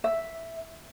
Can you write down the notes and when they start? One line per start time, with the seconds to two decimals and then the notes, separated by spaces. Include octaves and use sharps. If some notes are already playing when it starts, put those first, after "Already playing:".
0.04 E5